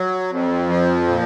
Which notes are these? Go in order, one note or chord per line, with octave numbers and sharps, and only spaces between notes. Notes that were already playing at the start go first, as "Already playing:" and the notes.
Already playing: F#3
F2
F3
A#2